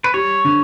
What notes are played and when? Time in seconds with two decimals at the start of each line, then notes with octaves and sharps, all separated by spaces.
0.04 B4
0.14 G3 C#5
0.45 D3